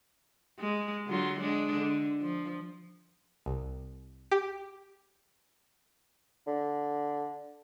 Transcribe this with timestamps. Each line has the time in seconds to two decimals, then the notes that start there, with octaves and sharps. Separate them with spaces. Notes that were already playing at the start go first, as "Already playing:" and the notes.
0.59 G#3
1.06 D3 F#3 F4
1.40 G#3 D4
1.74 D3
2.21 F3
3.46 C2
4.31 G4
6.47 D3